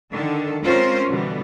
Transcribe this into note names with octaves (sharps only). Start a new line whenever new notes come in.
D3 D#3 A4
G#3 C4 C#4 F4 A#4 C5
B2 D3 E3 G3 B3